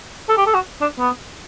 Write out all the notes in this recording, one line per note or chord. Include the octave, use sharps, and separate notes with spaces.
A4
G4
A4
F#4
D4
B3